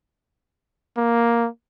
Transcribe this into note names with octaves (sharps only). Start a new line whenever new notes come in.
A#3